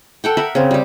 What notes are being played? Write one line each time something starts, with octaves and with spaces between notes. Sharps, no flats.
A4 F#5 G5
A#4 E5 F#5 B5
C#3 C4
G3 G4